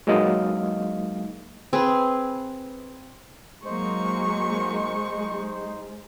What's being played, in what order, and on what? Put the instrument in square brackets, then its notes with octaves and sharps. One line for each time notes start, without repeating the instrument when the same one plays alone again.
[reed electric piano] F#3 G#3 A#3 D#4 D#5 F5
[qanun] C4 G#4 B4
[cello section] F#3 A#3 [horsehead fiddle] G#3 [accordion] D#4 C5 [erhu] C#6